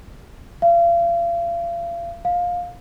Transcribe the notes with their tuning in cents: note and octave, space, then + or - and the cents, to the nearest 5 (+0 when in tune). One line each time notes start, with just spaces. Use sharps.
F5 -40
F5 +20